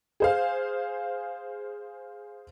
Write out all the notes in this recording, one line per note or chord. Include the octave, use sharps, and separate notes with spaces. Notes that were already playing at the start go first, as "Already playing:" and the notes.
G#4 C5 F5